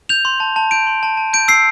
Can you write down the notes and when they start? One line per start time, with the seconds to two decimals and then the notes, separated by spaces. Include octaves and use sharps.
0.09 G6 F7
0.25 C6
0.40 A5
0.56 A5
0.71 G6 D7
0.87 C6
1.03 A5
1.17 A5
1.33 G6 D7
1.48 E6 C7